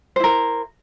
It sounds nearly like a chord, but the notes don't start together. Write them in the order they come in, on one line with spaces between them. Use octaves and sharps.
C5 E4 A#4